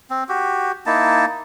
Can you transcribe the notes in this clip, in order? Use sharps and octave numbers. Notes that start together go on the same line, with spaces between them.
C4
F#4 G4
A#3 D#4 E4 A5